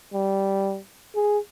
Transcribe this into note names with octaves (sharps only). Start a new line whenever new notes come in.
G3
G#4